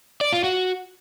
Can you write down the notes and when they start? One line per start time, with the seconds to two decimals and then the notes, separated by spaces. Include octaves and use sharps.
0.21 D5
0.32 F4
0.44 F#4